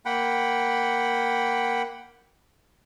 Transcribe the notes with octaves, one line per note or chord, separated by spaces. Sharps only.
A#3 F#5 G5 B5